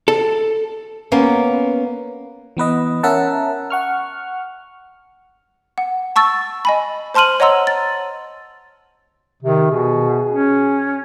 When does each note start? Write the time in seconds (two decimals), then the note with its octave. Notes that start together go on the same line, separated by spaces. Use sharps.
0.08 A4
1.12 A#3 B3 C#4
2.57 E3 B3 B4 D#5
3.03 C#4 A#4 E5 F#5 A5
3.70 F#5 C#6 F6
5.78 F#5
6.16 A5 C#6 E6 A6
6.65 D#5 G#5 B5
7.14 C5 A5 C6 F6 D#7 F#7
7.40 C#5 D#5 F#5 A#5 C6 E6
7.67 A6
9.43 C3 D#3
9.72 B2 G#4
10.31 C#4